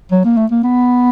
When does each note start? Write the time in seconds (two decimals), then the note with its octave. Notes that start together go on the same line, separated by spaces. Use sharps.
0.12 F#3
0.25 A#3
0.37 A3
0.51 A#3
0.64 B3